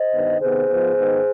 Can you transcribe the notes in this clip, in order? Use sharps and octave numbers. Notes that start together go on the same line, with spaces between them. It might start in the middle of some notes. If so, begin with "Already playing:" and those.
Already playing: C5 D#5
G2 D#3 B3
C3 D#3 B3 G#4 C5
G#2 F3 B3
G#2 D#3 B3